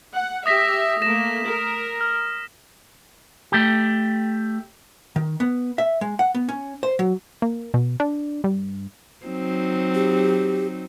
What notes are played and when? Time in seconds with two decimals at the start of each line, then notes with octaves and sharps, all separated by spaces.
0.16 F#5
0.46 G4 E5 D#6 A#6 B6
1.02 A3 A#3 A#6 E7
1.47 A#4
2.01 F6
3.52 A3 G4
5.16 D#3
5.40 B3
5.78 E5
6.01 G#3
6.19 F#5
6.35 B3
6.49 C#4
6.83 C5
6.99 F#3
7.42 A#3
7.74 B2
8.00 D4
8.44 G2
9.25 F#3 C4 D#4
9.95 G4